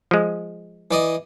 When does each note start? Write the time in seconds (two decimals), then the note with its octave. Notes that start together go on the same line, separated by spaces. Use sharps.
0.11 F3 G#3
0.91 E3 D5 D#5